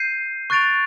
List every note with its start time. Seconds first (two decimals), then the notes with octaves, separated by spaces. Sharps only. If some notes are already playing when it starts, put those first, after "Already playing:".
Already playing: G6 C7 D#7
0.50 C#6 F#6 A6 D7 F7